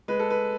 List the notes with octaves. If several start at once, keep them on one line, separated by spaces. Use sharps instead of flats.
G#3 B4
A4
B4